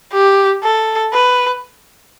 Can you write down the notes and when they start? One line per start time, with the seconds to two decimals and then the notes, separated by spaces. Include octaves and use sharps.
0.13 G4
0.63 A4
1.13 B4